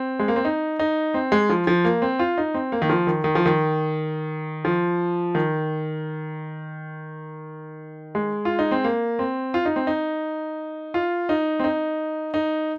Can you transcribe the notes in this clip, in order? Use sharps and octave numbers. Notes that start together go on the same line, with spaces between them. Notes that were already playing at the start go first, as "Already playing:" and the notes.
Already playing: C4
G#3
A#3
C4
D#4
D#4
C4
G#3
F3
F3
A#3
C4
F4
D#4
C4
A#3
D#3
F3
D#3
D#3
F3
D#3
F3
D#3
G#3
F4
D#4
C4
A#3
C4
F4
D#4
C4
D#4
F4
D#4
C4
D#4
D#4